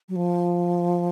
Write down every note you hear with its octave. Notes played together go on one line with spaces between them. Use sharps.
F#3
F3